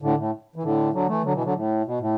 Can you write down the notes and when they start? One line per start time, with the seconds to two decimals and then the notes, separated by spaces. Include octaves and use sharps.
0.02 A2 D3
0.17 A2
0.56 E3
0.63 A2 D3
0.93 D3 F#3
1.08 E3 A3
1.24 D3 F#3
1.34 B2 E3
1.44 D3 F#3
1.55 A2
1.85 B2
2.00 A2